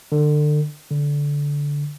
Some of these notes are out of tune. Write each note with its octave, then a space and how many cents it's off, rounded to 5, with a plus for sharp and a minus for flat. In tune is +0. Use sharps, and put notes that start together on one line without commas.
D3 +30
D3 -20